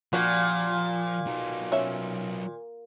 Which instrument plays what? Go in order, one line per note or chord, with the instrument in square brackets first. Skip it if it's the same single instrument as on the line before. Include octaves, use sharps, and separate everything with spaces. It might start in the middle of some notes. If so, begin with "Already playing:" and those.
[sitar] A#2 [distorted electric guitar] F3 [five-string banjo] D4 F#4 G4
[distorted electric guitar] F#3 D#4
[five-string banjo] C#4 E5